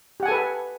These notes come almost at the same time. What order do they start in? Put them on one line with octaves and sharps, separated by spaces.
G4 F#5 G#5 A4 B4